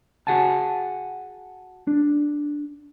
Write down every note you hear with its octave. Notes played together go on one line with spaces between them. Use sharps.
F#4 G#4 F#5 G#5 A5
D4